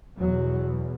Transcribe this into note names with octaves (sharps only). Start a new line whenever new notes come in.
E2 B2 F#3